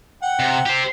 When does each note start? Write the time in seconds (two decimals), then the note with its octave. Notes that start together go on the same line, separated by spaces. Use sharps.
0.22 F#5 G5
0.40 C3
0.66 G4 C5